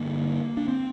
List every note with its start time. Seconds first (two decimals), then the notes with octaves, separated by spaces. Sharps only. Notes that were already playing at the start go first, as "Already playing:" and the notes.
Already playing: G2 D3 A#3
0.57 D4
0.68 C4